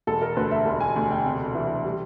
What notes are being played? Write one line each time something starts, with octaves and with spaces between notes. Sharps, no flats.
E1 A4
A#4
D2 B4
E5
E1
G#5
D2 G#5
G5
C3
E3
G3